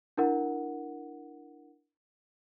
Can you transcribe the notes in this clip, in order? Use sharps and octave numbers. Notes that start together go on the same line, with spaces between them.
D4 E4 A#4 F#5